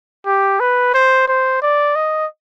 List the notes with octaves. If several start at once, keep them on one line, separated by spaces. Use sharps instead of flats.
G4
B4
C5
C5
D5
D#5